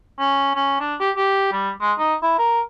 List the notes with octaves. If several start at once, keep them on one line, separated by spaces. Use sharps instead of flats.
C#4
C#4
D4
G4
G4
G3
G#3
D#4
E4
A#4